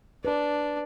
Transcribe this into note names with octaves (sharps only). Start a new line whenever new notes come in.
D4 B4 D5